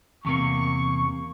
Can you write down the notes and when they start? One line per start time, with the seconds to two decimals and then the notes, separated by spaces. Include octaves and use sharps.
0.25 E2 C3 A#3 C#6